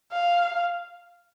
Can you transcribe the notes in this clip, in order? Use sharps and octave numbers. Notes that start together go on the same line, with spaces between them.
F5